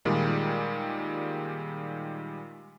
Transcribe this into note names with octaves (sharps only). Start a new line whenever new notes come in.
A#2 D#3 G3 G#3